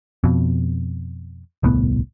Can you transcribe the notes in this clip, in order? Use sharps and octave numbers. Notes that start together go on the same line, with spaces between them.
F2 B2
D#1 C2 A2 B3